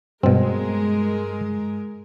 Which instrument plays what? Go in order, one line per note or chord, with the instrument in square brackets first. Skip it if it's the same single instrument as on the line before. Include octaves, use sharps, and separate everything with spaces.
[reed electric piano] G2 [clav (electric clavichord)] B2 C4 [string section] G#3 A#4